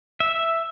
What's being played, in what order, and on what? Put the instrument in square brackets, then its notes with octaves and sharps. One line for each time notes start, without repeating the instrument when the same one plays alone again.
[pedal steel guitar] E5